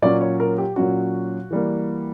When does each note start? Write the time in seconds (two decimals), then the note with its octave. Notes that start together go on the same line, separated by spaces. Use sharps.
0.02 A#2 F#3 C#4 D5
0.21 C#5
0.40 A#4
0.58 G4
0.76 A#2 F#3 C#4 F#4
1.50 E3 G3 A#3